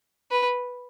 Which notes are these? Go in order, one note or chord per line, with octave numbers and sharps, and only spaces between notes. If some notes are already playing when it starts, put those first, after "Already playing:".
B4